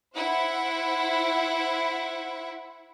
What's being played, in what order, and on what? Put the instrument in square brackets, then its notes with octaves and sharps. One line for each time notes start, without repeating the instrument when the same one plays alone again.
[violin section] E4 C5 F#5